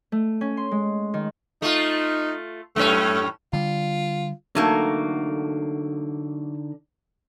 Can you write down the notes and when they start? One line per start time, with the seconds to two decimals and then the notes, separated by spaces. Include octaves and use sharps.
0.12 A3
0.41 C#4
0.57 C6
0.71 G#3
1.14 D#3
1.62 A3 D#4 F4
2.76 F#2 A2 A3 C#4
3.53 D3 G3 F4
4.55 D3 F#3 A3 A#3 D#4 F#5